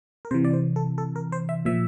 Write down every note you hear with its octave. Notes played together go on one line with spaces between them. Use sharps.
A#4
C3 E3 C5
D5
C5
A4
A4
A#4
C5
E5
A#2 F3 E5